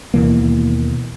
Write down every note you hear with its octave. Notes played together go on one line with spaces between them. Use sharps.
D#2 B2 E3 A#3